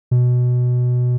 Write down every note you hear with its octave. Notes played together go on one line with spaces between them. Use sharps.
B2